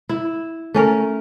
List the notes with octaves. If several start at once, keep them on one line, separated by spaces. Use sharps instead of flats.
E4
A3 C#4 A#4